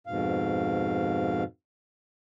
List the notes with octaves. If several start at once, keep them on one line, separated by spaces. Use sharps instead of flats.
F2 G#2 B2 F5